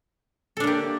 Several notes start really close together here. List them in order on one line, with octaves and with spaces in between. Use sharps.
A4 D4 A#3 G4